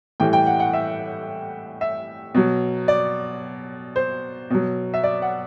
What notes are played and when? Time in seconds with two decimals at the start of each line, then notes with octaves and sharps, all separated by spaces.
0.20 A2 E3 G3 G5
0.33 G5
0.46 F#5
0.60 F#5
0.73 E5
1.81 E5
2.35 B2 F#3
2.88 D5
3.96 C5
4.50 B2 F#3
4.94 E5
5.04 D5
5.22 F#5